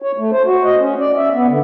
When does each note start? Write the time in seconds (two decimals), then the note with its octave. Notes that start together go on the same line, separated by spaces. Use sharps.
0.02 C#5
0.18 A3
0.32 C5
0.46 F#4
0.64 D#5
0.79 C#4
1.00 D5
1.17 E5
1.34 B3
1.49 D3